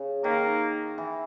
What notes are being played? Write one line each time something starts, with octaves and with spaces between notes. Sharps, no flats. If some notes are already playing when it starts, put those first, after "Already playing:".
Already playing: C#3
D#3 A#3
E3